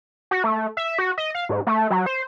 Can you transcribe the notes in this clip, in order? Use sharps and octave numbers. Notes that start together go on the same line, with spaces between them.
F#4
A3
E5
F#4
D#5
F5
G#2
A3
F#3
C5